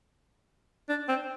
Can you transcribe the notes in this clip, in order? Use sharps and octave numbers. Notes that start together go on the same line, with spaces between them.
D4
C4